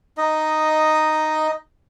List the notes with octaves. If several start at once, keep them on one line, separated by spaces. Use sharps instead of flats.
D#4 D#5